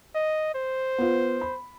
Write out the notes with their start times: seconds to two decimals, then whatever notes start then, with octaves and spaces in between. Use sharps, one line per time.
0.15 D#5
0.55 C5
0.98 B3 F4
1.41 B5